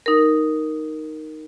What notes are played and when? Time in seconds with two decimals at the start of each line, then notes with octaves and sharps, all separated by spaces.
0.06 D#4 A#4